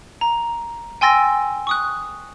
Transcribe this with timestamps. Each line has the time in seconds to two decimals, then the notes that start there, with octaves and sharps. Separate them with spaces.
0.21 A#5
1.01 G5 G#5 C6 E6 A6 A#6
1.67 C#6 D#6 F#6